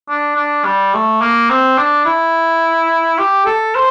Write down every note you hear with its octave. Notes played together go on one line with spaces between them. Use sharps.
D4
D4
G3
A3
A#3
C4
D4
E4
G4
A4
C5